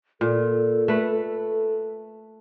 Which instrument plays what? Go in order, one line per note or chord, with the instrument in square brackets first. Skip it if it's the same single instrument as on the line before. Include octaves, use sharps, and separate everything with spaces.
[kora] A#2 [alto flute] A4
[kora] A3 B4